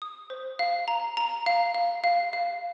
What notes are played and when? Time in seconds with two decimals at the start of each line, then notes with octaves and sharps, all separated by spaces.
0.02 D#6
0.30 C5
0.59 F5
0.88 A#5
1.17 A#5
1.46 F5
1.75 F5
2.04 F5
2.33 F5